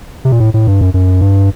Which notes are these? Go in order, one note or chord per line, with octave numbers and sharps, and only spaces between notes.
C3
A#2
A2
A2
G2
F#2
F#2
G2